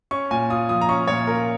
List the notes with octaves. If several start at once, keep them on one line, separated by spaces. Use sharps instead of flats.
C#4 C#6
A#2 G#5
F4 D#6
F3 D#6
A#5
C#4 C#6
A#2 C#5
F4 A#4